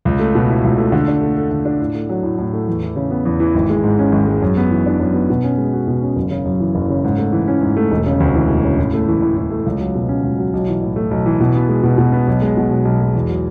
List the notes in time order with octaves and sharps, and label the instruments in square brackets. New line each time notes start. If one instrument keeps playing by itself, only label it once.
[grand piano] C#2
A3
B2
E4
C#2
A3
D3
D4
A3
A4
D3
D4
A2
A3
F#3
A2
A2
A3
E2
E3
C#3
B3
E2
E3
G#1
G#3
G#2
C#4
G#1
G#3
F#2
B3
E3
D4
F#2
B3
B2
C#4
G#3
F#4
B2
C#4
F#1
C#3
F#2
E3
F#1
C#3
G#2
A3
E3
C#4
G#2
A3
E1
C#3
D2
E3
E1
C#3
A2
A3
E3
A2
A2
A3
C#2
F#3
B2
C#4
C#2
F#3
B1
E3
A2
A3
B1
E3
B2
B3
G#3
B2
B2
B3
B1
G#3
B2
B1
B1
G#3
E2
F#3